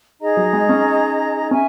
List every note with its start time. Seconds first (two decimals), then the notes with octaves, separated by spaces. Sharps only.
0.20 D#4 G#4 D#5 A#5
0.37 F#3
0.53 G#3
0.69 C#4
1.51 C#4 E5 G#5